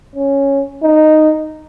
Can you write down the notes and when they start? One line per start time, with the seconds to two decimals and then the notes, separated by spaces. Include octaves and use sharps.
0.15 C#4
0.83 D#4